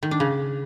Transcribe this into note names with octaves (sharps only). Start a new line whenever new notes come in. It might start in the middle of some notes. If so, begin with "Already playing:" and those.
D#3
D4
C#3